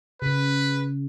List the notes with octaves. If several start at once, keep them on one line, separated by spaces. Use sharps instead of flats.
C#3 B4